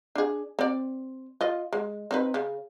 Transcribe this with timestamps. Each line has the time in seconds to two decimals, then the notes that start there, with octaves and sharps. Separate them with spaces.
0.15 D4 G#4
0.59 C4 D5
1.41 F4 D#5
1.73 G#3
2.11 C4 D#4 B4
2.34 C#3